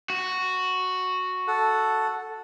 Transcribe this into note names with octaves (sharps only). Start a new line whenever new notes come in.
F#4
A4 F#5